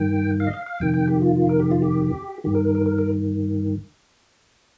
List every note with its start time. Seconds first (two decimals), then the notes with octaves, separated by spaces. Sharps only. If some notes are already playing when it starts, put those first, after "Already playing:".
Already playing: G2 D#3 G5
0.40 F5
0.47 D#5
0.53 F5
0.66 F5
0.80 F2 C3 D#3 G5
0.94 G5
1.08 G4
1.22 F4
1.36 F4
1.49 A#4
1.59 G4
1.71 F4
1.82 G4
2.44 G2 D#3 G4
2.55 A#4
2.65 A#4
2.75 A#4
2.86 A#4
2.98 A#4